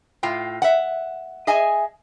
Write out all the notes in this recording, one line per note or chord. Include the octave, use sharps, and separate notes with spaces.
A2 F4 G5
E5 F#5
G#4 D#5 E5 G#5